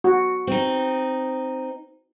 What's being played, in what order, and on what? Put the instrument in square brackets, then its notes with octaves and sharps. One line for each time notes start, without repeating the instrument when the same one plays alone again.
[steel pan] F#4
[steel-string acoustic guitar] C4 D#4